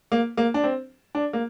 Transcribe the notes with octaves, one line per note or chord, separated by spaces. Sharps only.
A#3
A#3
D4
C4
D4
A#3